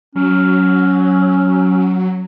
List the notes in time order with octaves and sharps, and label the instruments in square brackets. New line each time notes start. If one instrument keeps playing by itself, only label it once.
[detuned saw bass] F#3 [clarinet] C#4